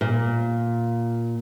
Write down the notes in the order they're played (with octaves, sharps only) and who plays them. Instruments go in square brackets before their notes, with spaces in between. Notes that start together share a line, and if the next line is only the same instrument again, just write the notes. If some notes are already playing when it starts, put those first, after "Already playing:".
[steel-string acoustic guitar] A#2